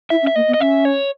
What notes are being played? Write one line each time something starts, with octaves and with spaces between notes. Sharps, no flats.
E4 E5
C#4
E5
A#3 D#5
B3
D#5
C#4 E5
C#5